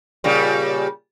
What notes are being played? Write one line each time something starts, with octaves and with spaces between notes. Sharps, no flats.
A#2 C#3 G3